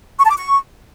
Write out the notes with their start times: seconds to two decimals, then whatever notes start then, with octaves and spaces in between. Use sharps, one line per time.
0.18 C#6
0.24 A5
0.30 D6
0.36 C#6